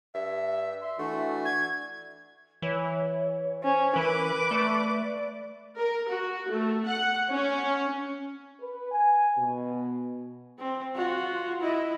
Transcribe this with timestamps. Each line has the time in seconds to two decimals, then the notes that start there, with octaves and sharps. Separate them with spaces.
0.15 G2 E5
0.82 E5 C6
0.99 E3 A3 D4 F#4
1.45 G#6
2.62 E3 C#5
3.63 C#4 C5
3.96 E3 A#4 B4 D6
4.51 A3 D5
5.77 A#4
6.09 F#4
6.51 A3
6.86 F#5
7.32 C#4
8.60 B4
8.92 G#5
9.38 B2
10.59 C4
10.95 F4 F#4
11.61 E4 D#5